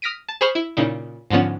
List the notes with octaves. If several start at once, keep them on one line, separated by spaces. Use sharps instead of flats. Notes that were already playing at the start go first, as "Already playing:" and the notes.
D#6 F6 A#6 B6 D7 D#7
A5
G#4 C5 B5 C#6 F6
E4
A#2 C#3 D#4 E4
G#2 D3 F3 B3 C#4